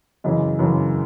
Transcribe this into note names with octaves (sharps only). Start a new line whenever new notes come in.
F#2 C#3 E3 D#5
F#2 C#3 E3